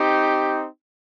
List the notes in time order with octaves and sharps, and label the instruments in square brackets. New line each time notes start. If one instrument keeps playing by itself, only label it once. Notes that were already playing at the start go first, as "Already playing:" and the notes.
Already playing: [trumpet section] C4 D#4 G4